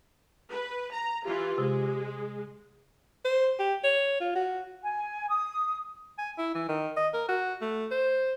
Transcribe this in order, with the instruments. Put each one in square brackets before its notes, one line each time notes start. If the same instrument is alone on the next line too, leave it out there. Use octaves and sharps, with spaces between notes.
[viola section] B4
A#5
[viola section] E3 F4 [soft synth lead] G4
[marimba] C3 [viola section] G#3
[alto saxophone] C5
G4
C#5
F4
F#4
[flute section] G#5
D#6
[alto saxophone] G#5
E4
E3
D#3
D#5
A#4
F#4
A3
C5